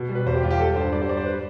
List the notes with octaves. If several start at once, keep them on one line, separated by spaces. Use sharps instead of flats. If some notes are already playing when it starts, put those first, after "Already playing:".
Already playing: B2
G3
B4
E2 C5
G4
E2 F4
G4
G3 A4
G2 C5
G3 D5
C5
G3 D5
C5
B4